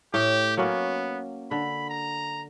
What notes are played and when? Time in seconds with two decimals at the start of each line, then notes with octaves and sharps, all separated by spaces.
0.14 A2 G4
0.57 F#3 A#3 B3 C#4
1.51 D3 B5
1.90 A#5